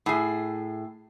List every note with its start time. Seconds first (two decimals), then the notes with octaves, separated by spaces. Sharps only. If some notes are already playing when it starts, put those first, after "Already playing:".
0.06 A2 G#4